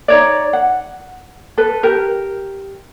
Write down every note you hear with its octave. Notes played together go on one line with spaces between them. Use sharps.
D#4 C#5 D5
F#5
A4 B4
G4 A#4